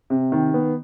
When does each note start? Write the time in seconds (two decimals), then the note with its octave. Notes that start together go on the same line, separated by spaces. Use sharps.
0.10 C3
0.32 D#3
0.54 B3